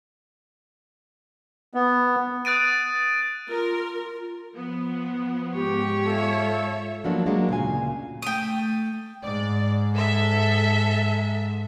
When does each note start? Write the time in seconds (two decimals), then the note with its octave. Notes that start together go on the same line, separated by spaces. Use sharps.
1.74 B3
2.45 D#6 F#6 A6 D7 D#7
3.49 F4 A#4
4.53 F3 B3
5.54 G#2 G4 C#5
6.04 F4 A4 E5
7.04 F3 F#3 A#3 B3 D4 F#4
7.26 F#3 G#3 A#3 B3 D4 F#4
7.48 D2 A#2 C#3 F5 G#5
8.22 A3 G5 D#6
9.24 G#2 D5
9.94 A4 E5